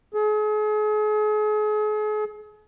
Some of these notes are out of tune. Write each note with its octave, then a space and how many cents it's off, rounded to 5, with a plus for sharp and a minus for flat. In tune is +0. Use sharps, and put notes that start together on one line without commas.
G#4 +40